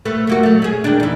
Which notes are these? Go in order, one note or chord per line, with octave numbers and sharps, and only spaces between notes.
A3 B3
A3 A#3 F#4
F#3 A3
C#4 G#4
D#3 D4
D#2 E3